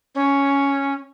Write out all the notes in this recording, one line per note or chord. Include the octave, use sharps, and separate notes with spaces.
C#4